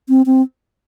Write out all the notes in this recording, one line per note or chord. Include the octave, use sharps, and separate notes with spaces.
C4
C4